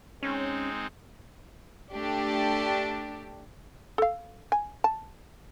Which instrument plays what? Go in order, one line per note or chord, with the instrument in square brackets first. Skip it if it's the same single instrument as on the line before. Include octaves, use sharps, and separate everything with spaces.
[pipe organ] G#3 C4 D#4 [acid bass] C#4
[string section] A3 D4 G4
[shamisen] A4 F5
G#5
A5